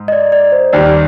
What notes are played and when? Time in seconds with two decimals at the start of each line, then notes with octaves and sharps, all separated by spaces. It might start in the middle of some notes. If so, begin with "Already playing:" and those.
Already playing: G#2
0.08 D#5
0.12 D5
0.32 D5
0.52 C5
0.73 D#2 D#3 G3 D5